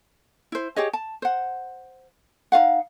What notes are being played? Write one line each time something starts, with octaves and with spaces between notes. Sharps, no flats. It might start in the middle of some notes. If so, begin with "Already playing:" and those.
E4 C5
G4 G#4 C#5 D#5
A5
C5 F#5
D#4 F4 F5 F#5